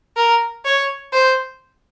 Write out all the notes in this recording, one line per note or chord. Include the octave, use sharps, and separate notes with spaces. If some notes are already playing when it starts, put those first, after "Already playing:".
A#4
C#5
C5